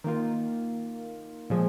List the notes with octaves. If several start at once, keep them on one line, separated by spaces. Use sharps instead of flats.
D#3 A#3 F4
A#2 F3 G#3